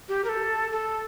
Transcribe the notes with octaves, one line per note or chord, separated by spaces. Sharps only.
G4
A#4
A4
A4